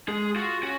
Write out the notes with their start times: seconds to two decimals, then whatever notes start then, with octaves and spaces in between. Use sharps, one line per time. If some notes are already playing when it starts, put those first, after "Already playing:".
0.08 G#3 G#4
0.35 F4 F#4
0.63 C#4 F#4